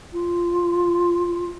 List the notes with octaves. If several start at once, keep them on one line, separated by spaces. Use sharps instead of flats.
F4